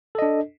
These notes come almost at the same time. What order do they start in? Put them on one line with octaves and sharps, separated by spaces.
A4 D#5 D4